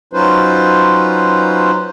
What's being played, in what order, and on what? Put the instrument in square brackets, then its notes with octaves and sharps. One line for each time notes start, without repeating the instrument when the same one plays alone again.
[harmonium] F#3 C#4 D#4 F4 B4 C5